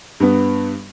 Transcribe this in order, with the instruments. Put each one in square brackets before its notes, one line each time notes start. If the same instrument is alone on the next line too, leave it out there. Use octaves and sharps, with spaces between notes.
[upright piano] G2 B3